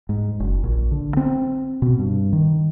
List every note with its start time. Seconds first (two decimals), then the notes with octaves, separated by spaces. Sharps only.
0.09 G#2
0.40 F#1
0.64 A#1
0.91 D3
1.17 C4
1.82 B2
1.99 G2
2.33 D#3